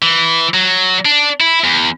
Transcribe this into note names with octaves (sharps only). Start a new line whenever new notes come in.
E3
F#3
D4
E4
E2